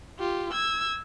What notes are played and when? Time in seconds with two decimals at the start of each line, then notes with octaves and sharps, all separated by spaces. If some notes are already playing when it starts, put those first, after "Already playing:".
0.19 F4 G4
0.53 E6 G#6